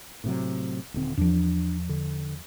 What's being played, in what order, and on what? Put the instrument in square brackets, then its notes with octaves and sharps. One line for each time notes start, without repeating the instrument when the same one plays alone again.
[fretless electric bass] A2 C3 F#3
D#1 D3 C4
[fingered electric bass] E2 F3 [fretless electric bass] D4
[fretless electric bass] D3